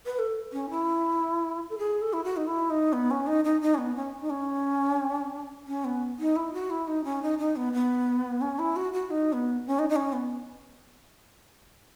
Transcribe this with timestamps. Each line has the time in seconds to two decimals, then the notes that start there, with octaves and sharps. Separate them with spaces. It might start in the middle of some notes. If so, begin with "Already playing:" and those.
0.06 B4
0.19 A4
0.53 C#4
0.70 E4
1.70 A4
1.78 G#4
2.02 A4
2.13 E4
2.24 F#4
2.37 D#4
2.47 E4
2.70 D#4
2.93 B3
3.11 C#4
3.27 D#4
3.44 D#4
3.61 D#4
3.75 C#4
3.78 B3
3.96 C#4
4.21 D#4
4.30 C#4
5.67 C#4
5.85 B3
6.19 D#4
6.36 E4
6.53 F#4
6.70 E4
6.87 D#4
7.04 C#4
7.22 D#4
7.39 D#4
7.56 B3
7.73 B3
8.41 C#4
8.59 E4
8.76 F#4
8.93 F#4
9.10 D#4
9.33 B3
9.67 C#4
9.79 D#4
9.89 D#4
9.96 C#4
10.13 B3